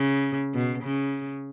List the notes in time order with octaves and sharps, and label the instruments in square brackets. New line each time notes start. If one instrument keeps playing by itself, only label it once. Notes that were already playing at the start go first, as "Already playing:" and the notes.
Already playing: [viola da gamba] C#3
B2
C#3